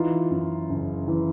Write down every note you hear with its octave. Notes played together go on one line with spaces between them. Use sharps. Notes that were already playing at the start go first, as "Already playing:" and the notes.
Already playing: E3 D#4 F4
F#2
F#1
E3